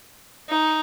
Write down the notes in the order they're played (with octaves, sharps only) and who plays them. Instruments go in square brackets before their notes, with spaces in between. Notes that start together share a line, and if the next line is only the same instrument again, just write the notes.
[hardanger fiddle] D#4